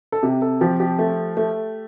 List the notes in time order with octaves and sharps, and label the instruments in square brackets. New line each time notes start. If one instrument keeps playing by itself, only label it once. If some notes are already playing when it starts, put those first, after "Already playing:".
[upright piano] A4
C3 G4
A4
F3 G4
G4
A3
A3